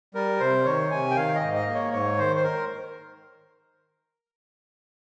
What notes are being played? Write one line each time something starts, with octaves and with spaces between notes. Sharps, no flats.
G3 A#4
C3 C5
D#3 C#5
C3 G#5
G5
D#3 F5
D#5
G#2
D#5
A#3
C#5
G#2 C#5
D#3 C5
C5
A#4